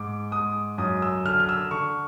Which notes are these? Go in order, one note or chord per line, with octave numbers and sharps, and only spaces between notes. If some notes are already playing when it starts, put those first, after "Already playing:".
Already playing: G#2 D6
G#2 D#6
F#2 D#6
E6
D3 F6
F6
E6
D3 C#6